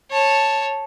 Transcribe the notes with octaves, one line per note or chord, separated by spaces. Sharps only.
C#5 A5